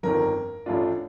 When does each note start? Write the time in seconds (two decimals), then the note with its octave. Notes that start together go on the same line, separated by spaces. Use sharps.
0.03 G1 F2 D#3 A#4
0.66 A1 A2 A3 D4 F4